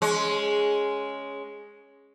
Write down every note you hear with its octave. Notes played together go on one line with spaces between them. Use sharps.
G#3 C#4